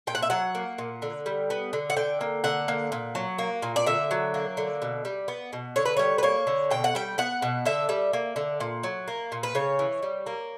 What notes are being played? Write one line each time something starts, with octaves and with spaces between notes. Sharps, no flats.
A#2 G5
F#5
E5
F#3 F#5
A#3
A#2
D3
G3
B3
D3
F#5
D3 G5
A#3
D3 F#5
A#3
A#2
F#3
A#3
A#2
D5
D3 E5
F#3
A#3
D3
B2
G3
B3
B2
D3 C#5
B4
G3 C#5
B4
A#3 C#5
D3
B2 G5
F#5
G3 G5
B3 F#5
B2
D3 E5
G3
A#3
D3
A#2
F#3
A#3
A#2
B4
C#3 C#5
E3
G3
A#3